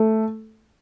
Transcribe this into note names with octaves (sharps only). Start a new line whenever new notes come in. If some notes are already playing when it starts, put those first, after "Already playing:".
Already playing: A3